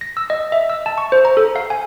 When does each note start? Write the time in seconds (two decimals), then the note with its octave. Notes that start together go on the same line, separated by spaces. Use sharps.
0.01 A#6
0.17 E6
0.30 D#5
0.52 E5
0.70 E6
0.86 A5
0.98 C#6
1.12 C5
1.25 A#5
1.37 A4
1.56 F5
1.70 G#5